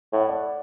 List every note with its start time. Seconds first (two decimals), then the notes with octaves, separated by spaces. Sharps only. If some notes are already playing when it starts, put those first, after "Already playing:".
0.13 A2 F#5
0.21 E5
0.29 D5 F#5